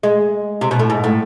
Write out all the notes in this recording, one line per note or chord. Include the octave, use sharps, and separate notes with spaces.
G#3
C3
B2
A2
G#2
A2